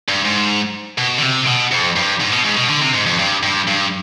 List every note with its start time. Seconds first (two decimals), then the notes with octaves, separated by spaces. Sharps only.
0.08 G2
0.25 G#2
0.98 B2
1.19 D3
1.23 C3
1.47 B2
1.72 F2
1.96 G2
2.21 G#2
2.33 B2
2.45 G#2
2.57 B2
2.70 D3
2.82 C3
2.94 G#2
3.06 F2
3.19 G2
3.43 G2
3.67 G2